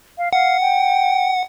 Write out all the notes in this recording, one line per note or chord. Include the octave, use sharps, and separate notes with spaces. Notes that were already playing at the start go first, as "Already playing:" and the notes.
F5
F5 F#5
G5